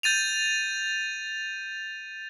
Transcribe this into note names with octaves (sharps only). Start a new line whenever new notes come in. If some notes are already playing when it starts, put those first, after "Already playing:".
G6 A6 D#7 F7